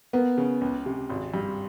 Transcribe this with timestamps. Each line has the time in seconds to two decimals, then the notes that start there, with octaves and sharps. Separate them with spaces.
0.13 A#3 B3
0.38 C#3
0.61 C#2
0.86 C3
1.09 G#1
1.34 G2